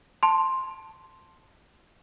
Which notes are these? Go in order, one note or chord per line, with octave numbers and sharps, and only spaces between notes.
A5 C6